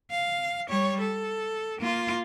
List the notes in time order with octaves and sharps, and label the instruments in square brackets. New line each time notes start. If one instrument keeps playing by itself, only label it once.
[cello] F5
G3 C#5
A4
A#3 F4